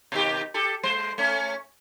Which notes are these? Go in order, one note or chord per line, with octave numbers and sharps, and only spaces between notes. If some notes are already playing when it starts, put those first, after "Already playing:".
B2 D#3 G4
G4 A4
G#3 C5
A3 C#4